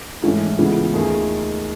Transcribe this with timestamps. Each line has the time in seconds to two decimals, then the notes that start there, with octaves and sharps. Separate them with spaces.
0.23 G#2 E3 A3 C#4
0.58 C#2 C#3 E3 B3
0.94 D#2 D#3 A3 D#4 G#4